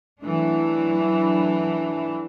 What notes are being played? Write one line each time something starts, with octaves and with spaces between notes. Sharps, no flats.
E3 F#3 A3 D4